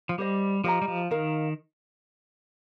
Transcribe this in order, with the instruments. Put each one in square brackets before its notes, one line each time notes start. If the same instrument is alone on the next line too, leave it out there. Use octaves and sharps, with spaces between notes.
[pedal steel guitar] F3
[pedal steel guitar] G3 [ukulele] G4 C5 D#5
[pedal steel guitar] F3 [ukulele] G4 D#5 A#5
[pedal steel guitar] G3
F3
[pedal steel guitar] D#3 [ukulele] D#4 A#4 F5